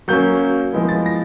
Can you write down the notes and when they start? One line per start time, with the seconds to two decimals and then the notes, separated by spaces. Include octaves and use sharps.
0.08 F#3 A#3 C#4 G6
0.73 F3 G#3 B3 E4
0.89 A6
1.06 A#6